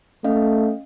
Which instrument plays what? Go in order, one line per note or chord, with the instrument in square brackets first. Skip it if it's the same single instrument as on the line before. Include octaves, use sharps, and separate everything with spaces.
[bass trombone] A3 [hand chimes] C#4 D#5 F5